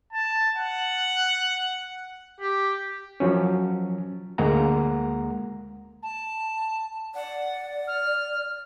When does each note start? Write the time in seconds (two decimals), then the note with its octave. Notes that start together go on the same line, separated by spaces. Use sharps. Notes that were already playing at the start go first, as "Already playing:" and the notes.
0.13 A5
0.56 F#5
2.40 G4
3.20 F3 F#3 C#4
4.38 D2 G#3 A#3 F#5 A#5
6.03 A5
7.15 D5 F#5
7.87 F6